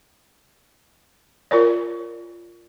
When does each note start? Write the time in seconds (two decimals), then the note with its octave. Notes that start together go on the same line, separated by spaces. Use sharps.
1.51 F4 A#4 C#5 D5